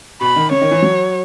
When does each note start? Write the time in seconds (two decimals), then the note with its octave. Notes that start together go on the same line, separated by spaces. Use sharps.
0.21 B2 B5
0.36 D#3
0.51 C#3 C#5
0.61 D#3
0.71 E3
0.82 F#3